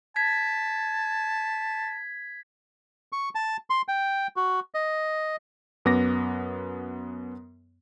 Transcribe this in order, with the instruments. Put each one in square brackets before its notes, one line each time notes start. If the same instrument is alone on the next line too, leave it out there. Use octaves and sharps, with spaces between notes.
[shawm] A5 [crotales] G#6 B6
[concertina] C#6
A5
C6
G5
F#4
D#5
[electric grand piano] F#2 B3 D6 A#6